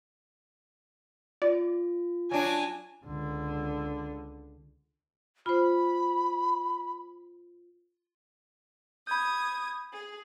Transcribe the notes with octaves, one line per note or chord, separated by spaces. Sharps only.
F4 D5
F#3 D4 G#5
C#2 D3
F4 C5 B5
B5 D#6 G6 G#6
G#4